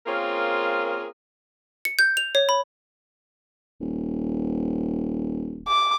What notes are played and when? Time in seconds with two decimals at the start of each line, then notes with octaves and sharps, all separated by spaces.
0.06 A#3 C4 C#4 F4 G#4 A#4
1.85 C#7
1.99 G6
2.17 F7
2.35 C#5
2.49 B5
3.80 D#1
5.68 D6